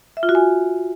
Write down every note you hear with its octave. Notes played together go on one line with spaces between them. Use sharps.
E5
F4
F#4
G#5